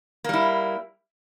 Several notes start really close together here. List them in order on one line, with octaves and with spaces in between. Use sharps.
A#3 G3 E4